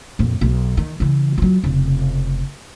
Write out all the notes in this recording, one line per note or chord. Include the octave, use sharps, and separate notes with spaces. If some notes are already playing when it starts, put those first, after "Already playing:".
A#1 F2
B1
D#3
C#3 E3
F#3 F4
F1 C#3